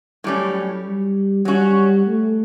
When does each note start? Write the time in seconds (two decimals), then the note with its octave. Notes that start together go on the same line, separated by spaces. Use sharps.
0.24 A2 F#3 G3 C#4
0.85 G3
1.45 F#3 G3 C#4 F#4
2.06 A3